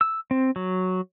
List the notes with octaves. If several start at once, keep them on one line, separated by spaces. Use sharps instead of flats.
E6
C4
F#3